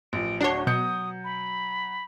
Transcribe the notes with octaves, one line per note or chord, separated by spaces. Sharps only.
A1 F3 D7
D1 D4 F#4 C#5 C7 G7
B2 F#3 D#6 G6 C#7
B5